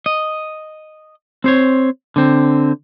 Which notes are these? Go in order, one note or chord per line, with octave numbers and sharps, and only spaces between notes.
D#5
C4 C5 C#5
D3 C4